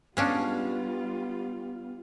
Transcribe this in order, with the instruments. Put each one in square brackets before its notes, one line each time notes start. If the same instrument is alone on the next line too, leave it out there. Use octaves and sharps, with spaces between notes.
[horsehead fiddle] G3 F4 [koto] G#3 C#4 D4 [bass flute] B3 [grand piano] F5